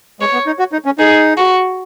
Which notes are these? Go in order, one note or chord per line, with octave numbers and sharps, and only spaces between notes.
G#3 C#5
B3
D#4
F#4
D#4
C#4
D#4 G#4
F#4